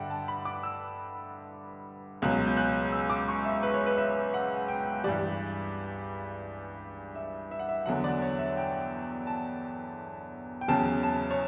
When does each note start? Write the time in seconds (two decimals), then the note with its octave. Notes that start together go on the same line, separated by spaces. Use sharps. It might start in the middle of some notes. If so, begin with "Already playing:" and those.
Already playing: G2 D3 D5 E5 F#5 G5
0.10 A5
0.28 B5
0.45 D6
0.63 E6
2.22 C#2 B2 F#3 F#6
2.47 G6
2.57 F#6
2.92 E6
3.10 D6
3.28 C#6
3.45 E5
3.63 B4
3.74 C#5
3.86 B4
3.98 E5
4.34 F#5
4.68 G5
5.04 G2 E3 G3 D5
7.15 E5
7.51 E5
7.59 F#5
7.69 E5
7.86 E2 D3 F#3 F#5
8.04 D5
8.22 C#5
8.39 E5
8.57 G5
9.27 A5
10.61 G5
10.68 E2 C#3 F#3 A5
11.03 A5
11.31 C#5